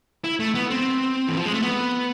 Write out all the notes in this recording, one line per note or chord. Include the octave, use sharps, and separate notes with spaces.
E4
A3
B3
C4
E3
F3
G#3
A3
B3